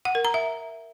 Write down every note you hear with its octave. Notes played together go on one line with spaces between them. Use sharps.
F#5
A#4
A#5
E5